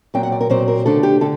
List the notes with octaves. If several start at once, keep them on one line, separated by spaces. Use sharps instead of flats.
A#2 F#3 C4 G5
F#5
D5
A#4
A#2 F#3 C4 C5
A#4
D3 A3 D4 A4
G4
D3 A4